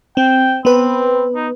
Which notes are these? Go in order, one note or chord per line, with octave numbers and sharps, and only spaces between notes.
C4 G5
B3 C4 B4
D#4